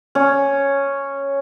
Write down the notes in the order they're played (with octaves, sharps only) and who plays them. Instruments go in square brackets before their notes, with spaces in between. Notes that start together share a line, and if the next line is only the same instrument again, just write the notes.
[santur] C#4